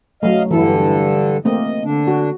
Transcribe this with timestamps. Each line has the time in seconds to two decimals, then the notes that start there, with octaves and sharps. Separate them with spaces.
0.23 F#3 A3 D#5 F5
0.51 G2 D3 E3 E4 A4
1.45 A3 A#3 C4 D#5
1.84 D3 D4
2.07 F#4